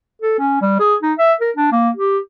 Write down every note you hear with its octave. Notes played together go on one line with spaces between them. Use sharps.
A4
C#4
G3
G#4
D#4
E5
A#4
D4
A#3
G4